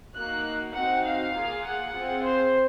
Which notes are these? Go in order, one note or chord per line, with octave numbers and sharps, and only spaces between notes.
A#3 D#4 F#4 F#6
C4 D#4 F#4 F#5
F5
A#3 F4 G#4
F#5
C4 F4 G#4
C5